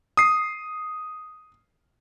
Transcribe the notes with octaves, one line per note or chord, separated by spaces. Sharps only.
D#6 C7